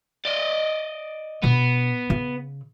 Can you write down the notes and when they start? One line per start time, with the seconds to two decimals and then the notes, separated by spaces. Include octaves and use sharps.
0.25 D5 D#5
1.43 B2 B3 D4
2.10 C#3